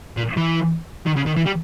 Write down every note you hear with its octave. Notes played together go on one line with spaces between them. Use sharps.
A#2
E3
D#3
C#3
D#3
E3
G3